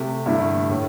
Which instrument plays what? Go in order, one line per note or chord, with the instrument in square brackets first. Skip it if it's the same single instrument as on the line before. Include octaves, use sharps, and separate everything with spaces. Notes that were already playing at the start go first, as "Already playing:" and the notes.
Already playing: [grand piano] C3 A3 G4
G2 D3 A3 E4
A2 A3